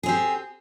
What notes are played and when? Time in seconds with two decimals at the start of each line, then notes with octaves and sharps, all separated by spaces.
0.03 G#4
0.06 C4
0.08 G4